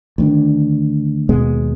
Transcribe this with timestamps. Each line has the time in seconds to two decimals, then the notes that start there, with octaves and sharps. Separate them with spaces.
0.18 D2 D#3 D4
1.29 D#2 B2 G#3 B3